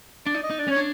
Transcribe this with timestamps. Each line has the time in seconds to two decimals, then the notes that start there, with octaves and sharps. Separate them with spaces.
0.26 D4 D5
0.34 D#4
0.43 D#5
0.50 D#4
0.59 D4 D5
0.68 C#4 C#5
0.76 D4